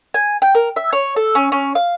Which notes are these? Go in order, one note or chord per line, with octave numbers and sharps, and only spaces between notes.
G#5
G5
A#4
E5
C#5
A4
C#4
C#4
F5